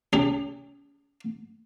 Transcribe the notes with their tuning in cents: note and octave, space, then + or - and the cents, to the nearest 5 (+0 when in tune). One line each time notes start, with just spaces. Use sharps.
C#4 +35 G4 +45